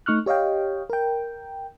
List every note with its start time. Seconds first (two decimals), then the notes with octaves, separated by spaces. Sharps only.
0.06 A3 D#4 C#6 F6 F#6
0.26 G4 C#5 D#5 F5 G5
0.90 A#4 G5